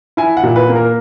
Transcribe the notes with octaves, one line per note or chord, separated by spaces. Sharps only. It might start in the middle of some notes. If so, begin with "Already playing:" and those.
E4 G#5
F#5
A#2
B4
A#3
A#4